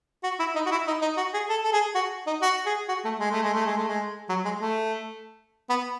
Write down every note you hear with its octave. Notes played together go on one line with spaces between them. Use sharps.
F#4
E4
D#4
F#4
E4
D#4
D#4
F#4
G#4
A4
A4
G#4
F#4
D#4
F#4
G#4
F#4
A3
G#3
A3
G#3
A3
G#3
A3
G#3
F#3
G#3
A3
B3